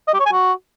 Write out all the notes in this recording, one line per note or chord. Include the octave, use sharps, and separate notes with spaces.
D#5
G4
C#5
G#5
F#4